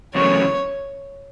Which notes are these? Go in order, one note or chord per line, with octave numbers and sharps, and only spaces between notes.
E2 C#3 F#3 A3 C#4 C#5